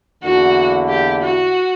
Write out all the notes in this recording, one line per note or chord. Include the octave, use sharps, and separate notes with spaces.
E2 D3 A#3 E4 F#4
G4
F#4